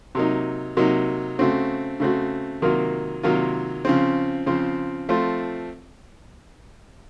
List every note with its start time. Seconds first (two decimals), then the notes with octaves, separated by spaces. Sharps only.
0.15 C3 F#3 A#3 D#4
0.77 C3 F#3 A#3 D#4
1.39 C#3 A3 C4 F#4
2.00 C#3 A3 C4 F#4
2.62 C3 D#3 F#3 A#3 F4
3.23 C3 D#3 F#3 A#3 F4
3.85 C#3 F3 C4
4.46 C#3 F3 C4
5.09 F3 A3 C4 F4